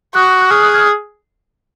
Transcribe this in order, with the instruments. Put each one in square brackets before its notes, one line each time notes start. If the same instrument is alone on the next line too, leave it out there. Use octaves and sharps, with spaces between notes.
[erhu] F#4 [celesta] D#6 F#6
[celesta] F#6
[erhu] G#4 [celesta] C#6 F6
[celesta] D#6 F#6
F6 G#6